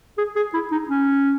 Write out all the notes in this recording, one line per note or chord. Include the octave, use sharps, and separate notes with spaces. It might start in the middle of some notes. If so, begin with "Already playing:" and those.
G#4
G#4
E4
D#4
C#4